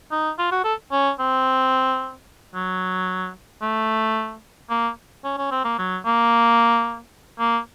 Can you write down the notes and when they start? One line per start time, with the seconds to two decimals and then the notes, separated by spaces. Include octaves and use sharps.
0.11 D#4
0.38 F4
0.51 F#4
0.64 A4
0.92 C#4
1.19 C4
2.54 F#3
3.62 A3
4.70 A#3
5.24 C#4
5.37 C#4
5.51 C4
5.64 A#3
5.78 F#3
6.05 A#3
7.39 A#3